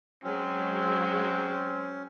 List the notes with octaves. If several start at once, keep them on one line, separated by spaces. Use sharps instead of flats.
F#3 G#3 C4 C#4